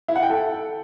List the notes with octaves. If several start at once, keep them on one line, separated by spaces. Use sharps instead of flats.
E4
F#5
G5
A4